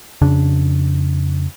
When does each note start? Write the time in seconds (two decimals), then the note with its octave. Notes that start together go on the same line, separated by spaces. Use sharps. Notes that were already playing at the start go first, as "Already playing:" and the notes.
0.22 F2 C#3 D4